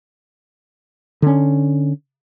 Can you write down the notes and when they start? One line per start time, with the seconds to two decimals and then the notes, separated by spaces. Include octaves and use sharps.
1.22 D3 C#4